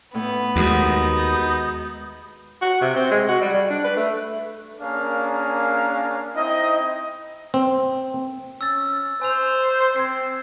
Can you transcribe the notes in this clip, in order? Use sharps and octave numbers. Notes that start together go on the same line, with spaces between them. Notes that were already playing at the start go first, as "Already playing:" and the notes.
A2 B3 D#4
D#2 G#3 D#4 F#4
F#4
C3
C4
G#3
F#4
G3
G3
D4
B4
A3
A#3 C#4 D4 G#4 A#4 F5
C4 D#4 E4 D#5
C4
C#4 E6 A6
C5 G#5 E6 F7
C4 G#6 C7